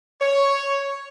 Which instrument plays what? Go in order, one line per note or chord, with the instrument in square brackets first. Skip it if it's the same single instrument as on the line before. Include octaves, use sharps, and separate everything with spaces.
[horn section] C#5